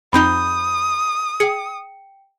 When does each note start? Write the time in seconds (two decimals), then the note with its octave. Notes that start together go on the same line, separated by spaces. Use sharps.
0.13 F2 C4 D#4 B5 D#6 G6 G7
1.40 G#4 G5 C#7